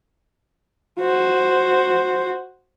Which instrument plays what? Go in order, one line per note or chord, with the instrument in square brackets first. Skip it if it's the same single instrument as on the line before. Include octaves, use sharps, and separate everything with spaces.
[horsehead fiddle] F#4 C5